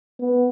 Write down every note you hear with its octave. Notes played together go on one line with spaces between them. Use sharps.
B3